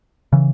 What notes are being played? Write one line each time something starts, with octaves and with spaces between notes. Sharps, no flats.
C#3 E3